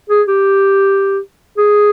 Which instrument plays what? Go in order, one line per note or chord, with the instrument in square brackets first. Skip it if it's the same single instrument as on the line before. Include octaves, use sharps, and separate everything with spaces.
[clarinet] G#4
G4
G#4